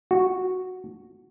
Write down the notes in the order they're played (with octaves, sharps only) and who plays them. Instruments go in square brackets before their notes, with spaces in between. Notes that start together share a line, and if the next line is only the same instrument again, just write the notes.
[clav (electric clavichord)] F#4